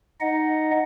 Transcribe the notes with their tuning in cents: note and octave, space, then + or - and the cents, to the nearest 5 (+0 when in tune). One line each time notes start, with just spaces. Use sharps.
D#4 +0 D#5 +0 F#5 +0